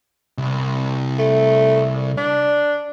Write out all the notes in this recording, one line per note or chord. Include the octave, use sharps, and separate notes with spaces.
C2
A3
D4